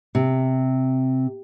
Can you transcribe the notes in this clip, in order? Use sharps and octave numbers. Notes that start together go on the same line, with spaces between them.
C3